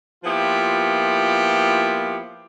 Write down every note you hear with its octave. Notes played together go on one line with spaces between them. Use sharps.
F3 A#3 B3 E4 F4 G4